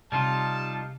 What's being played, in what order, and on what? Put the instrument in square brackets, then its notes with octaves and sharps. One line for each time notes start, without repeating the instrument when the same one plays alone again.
[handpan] C3 [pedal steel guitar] G3 D#4 F4 [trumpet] A5